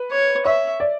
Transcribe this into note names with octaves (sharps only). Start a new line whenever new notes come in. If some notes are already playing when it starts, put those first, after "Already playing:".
Already playing: B4
C#5
C#5 E5
D5